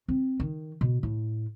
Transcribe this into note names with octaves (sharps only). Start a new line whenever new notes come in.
C4
D#3
B2
A2